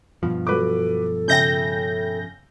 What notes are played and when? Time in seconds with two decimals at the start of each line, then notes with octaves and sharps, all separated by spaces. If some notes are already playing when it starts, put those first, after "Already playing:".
0.23 G2 B2 F3
0.47 F#3 A4 B4 D6
1.28 C#3 E5 G5 G6 A#6